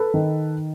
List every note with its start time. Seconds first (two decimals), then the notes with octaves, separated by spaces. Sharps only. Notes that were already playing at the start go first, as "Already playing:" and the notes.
Already playing: A4 B4
0.14 D#3